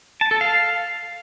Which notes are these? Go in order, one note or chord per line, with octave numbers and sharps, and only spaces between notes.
A5
A4
F5